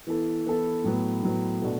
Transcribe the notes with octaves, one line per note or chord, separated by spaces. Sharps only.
E3 B3 E4 A4
E3 B3 E4 A4
A2 F#3 B3
A2 F#3 B3
B2 A3 D4 F#4